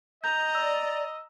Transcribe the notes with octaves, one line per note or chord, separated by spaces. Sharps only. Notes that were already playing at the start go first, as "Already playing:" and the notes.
D#5 A#5 G6
D5 E6